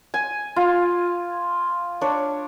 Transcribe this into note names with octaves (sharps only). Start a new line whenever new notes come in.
G#5
F4
D4 C#5